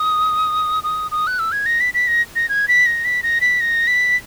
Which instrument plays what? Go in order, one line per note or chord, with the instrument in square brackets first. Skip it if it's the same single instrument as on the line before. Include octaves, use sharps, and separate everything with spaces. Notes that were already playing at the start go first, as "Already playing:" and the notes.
Already playing: [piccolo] D#6
D#6
D#6
F#6
E6
G#6
A#6
B6
B6
A#6
A#6
G#6
B6
A#6
B6
A#6
B6
A#6
B6